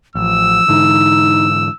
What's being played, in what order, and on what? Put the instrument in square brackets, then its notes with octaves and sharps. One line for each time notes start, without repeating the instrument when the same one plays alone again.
[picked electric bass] A1 [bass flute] F3 [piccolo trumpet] E6
[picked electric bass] G#2 D3 E3 [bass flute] D#4